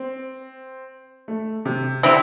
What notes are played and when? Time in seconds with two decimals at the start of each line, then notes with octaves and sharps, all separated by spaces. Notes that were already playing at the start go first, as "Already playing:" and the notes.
Already playing: C4
1.28 A3
1.65 C3
2.03 D3 G3 C4 E4